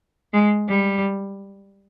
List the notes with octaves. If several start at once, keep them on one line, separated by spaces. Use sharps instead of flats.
G#3
G3